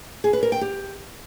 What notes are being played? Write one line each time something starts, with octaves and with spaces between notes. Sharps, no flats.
G#4
B4
A#4
G5
G4